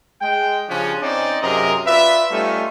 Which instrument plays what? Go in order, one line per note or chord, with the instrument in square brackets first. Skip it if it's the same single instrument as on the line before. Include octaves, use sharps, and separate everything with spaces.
[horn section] G#3 G5
C#3 F3 G3 C#4 D4
C4 C#4 D#4 C5 D5 D#5
F#2 C3 G#4 A#4 D#5 A#5
F4 B4 D5 E5
G3 A3 C#4 D#4 F4